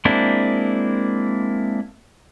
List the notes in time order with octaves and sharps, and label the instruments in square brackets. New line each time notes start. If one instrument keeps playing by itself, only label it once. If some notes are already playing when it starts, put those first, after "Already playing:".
[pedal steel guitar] G#3 A#3 C4 D4 E4